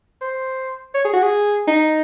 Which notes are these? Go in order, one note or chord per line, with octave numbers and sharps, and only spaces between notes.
C5
C#5
G#4
F#4
G#4
D#4